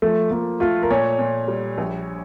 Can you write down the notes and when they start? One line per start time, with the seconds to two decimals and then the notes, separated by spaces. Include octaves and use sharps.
0.02 F3 A3
0.31 F3 A#3
0.60 A3 F4
0.83 A#4
0.90 A#2 C#5
1.19 A#2
1.48 G3
1.78 A#1